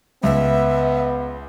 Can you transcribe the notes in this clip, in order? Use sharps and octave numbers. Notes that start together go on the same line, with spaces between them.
C#2 B3 E5